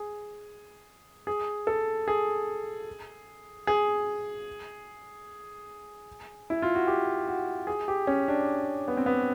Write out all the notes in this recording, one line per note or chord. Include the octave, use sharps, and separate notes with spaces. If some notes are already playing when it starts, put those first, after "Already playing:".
Already playing: G#4
G#4
A4
G#4
G#4
E4
F4
F#4
G4
F#4
G#4
G4
C#4
D4
B3
C4
B3